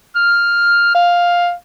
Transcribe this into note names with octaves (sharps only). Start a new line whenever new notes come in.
F6
F5